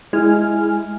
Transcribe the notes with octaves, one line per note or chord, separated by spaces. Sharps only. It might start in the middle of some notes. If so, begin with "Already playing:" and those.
G#3 E4 G#5 F6